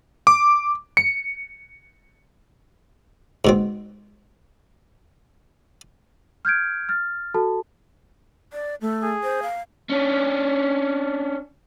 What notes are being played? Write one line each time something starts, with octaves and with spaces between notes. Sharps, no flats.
D6
C#7
G#2 B2 C4
F6 G6 G#6 D7
F6 A6
F#4 A4 A5
D5
A3
G#4
C5
F5
C#4 D4